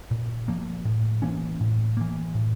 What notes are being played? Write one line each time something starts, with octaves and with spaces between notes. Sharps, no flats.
A#2
F3 A#3
A2
E3 A#3 C#4
A2
E3 A#3
A2